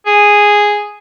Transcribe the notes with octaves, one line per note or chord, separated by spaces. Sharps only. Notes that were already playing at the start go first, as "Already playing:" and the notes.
G#4